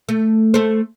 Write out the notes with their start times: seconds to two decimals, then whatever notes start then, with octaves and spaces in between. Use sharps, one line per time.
0.09 A3
0.54 A3 C5